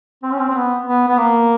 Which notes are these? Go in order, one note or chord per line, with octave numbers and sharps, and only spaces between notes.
C4
C#4
C4
C4
B3
B3
B3
A#3